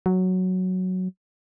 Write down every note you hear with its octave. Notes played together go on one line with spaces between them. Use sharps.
F#3